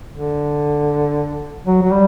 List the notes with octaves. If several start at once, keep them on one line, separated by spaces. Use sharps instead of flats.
D3
F#3
F#3
G3